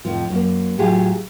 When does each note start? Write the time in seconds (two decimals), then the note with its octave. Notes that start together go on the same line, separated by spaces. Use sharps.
0.05 F2 A2 C3 F3
0.30 F#2 A#3
0.78 A2 F#3 F4 G4 G#4